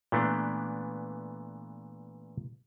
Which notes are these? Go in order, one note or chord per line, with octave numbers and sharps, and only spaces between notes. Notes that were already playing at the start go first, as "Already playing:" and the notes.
A#2 E3 A3 B3 D4